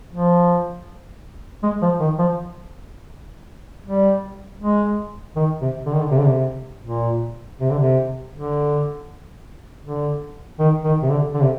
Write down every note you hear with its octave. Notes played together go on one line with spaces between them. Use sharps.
F3
G#3
F3
D#3
F3
G3
G#3
D#3
C3
D3
D#3
D3
C3
D3
C3
A#2
C3
D3
C3
D3
D3
D#3
D#3
C3
D3
D3
C3